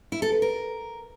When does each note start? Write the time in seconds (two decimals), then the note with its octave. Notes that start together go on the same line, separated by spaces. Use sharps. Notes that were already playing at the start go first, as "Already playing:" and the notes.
0.12 E4
0.22 A4
0.32 B4
0.42 A#4